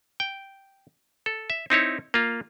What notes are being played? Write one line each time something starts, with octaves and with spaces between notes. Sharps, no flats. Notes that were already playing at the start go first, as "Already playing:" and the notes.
G5
A4
E5
C4 D#4 E4 C#5
A#3 F4